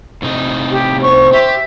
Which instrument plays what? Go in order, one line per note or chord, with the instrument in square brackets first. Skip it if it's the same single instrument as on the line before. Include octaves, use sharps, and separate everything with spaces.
[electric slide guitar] A2 C3 D#4
[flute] G4
[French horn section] C5 [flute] C#6
[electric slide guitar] G4 [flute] E5